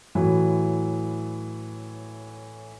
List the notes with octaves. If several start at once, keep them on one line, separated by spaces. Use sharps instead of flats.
A2 E3 F#3